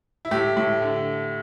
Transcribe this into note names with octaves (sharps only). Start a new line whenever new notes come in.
E4
A2 G4
A2
D3